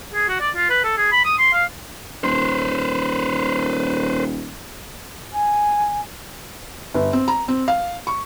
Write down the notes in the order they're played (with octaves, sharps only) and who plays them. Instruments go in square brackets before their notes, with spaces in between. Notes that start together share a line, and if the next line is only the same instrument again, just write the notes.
[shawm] G#4
F#4
D5
F4
B4
A4
G#4
B5
D#6
C6
F5
[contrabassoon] D#1 [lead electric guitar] B4 C5
[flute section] G#5
[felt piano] G1
C4
A#5
C4
F5
C#6